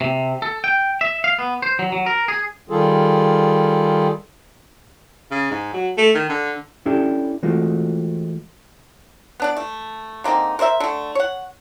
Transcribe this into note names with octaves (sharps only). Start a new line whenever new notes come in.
C3
A4
G5
E5
F5
B3
C5
F#3
F#3
A#4
G#4
D#3 G3 F4 G#4 A4
C#3
G#2
F#3
A3
D#3
D3
C#4 D4 E4 G4 A4
E3 G#3 A3 C4 F4 F#4
B3 D4 D5
A3
D3 A#3 C4 D#4
A#4 C5 D5 E5
D3 A3
C#5 F#5